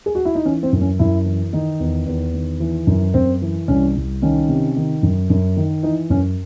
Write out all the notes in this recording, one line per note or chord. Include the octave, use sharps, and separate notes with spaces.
G#4
F#4
E4
D#4
E3 C#4
C4
F#2
C#4
F#2 E4
E3
D#3 D#4
E2
E2
D#3
E3
F#2
F#2 C4
E3
C2 C#4
C2
D#3 C#4
C3
D#3
F#2
F#2
D#3
E3 D#4
F#2 C#4